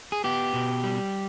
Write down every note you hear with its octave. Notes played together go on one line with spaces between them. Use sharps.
G#4
B3 G4
B2
G3